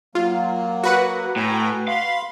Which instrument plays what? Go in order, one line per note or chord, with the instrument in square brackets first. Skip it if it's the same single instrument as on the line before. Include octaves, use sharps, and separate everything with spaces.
[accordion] F#3 A#3 [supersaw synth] F4
[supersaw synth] F#4 B4 F#5
[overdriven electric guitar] A2 [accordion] G5 G#5 A#5
[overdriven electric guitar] F5 [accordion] B5 C6